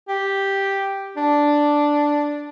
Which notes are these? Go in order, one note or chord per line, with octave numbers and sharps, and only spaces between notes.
G4
D4